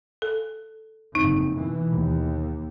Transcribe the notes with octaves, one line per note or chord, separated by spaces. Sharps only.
A4
F#1 F2 D#4
B2 E3
D#2